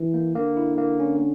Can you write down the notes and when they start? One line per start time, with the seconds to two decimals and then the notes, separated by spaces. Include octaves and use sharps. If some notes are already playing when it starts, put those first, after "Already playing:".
Already playing: E3
0.14 A#3
0.35 D3 A#3
0.57 E4
0.78 A#3
1.00 C#4